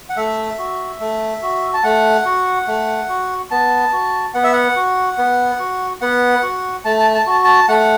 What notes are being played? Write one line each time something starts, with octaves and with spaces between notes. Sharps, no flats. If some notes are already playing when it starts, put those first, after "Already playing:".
F#5
A3 E5
F#4
A3
F#4
A5
A3 F#5
F#4
A3
F#4
B3 A5
F#4
B3 F#5
E5
F#5
F#4
B3
F#4
B3 F#5
F#4
A3 A5
A5
A5
F#4 A5
A5
A3 F#5